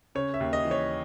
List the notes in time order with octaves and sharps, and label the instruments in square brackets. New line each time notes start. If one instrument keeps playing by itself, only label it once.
[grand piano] C#3 C#5
E5
D#2
D#5
E3
C#5